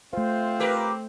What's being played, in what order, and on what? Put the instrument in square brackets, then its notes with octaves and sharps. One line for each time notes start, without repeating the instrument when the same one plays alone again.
[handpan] A3 C5 [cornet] C4 [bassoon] F4
[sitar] G4 A#4 B4